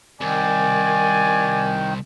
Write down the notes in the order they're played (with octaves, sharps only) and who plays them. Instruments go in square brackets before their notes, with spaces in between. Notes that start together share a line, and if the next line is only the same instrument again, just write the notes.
[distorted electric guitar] C2 [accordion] D#3 [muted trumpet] D5 [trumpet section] G#5